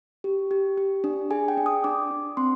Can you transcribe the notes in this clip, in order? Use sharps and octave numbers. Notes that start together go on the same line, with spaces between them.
G4
G4
G4
D4
G#4 G#5
G5
D4
D#6
D4 D6
D4
C4 C6